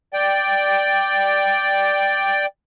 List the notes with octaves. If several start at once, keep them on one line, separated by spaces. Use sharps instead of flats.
D5 G5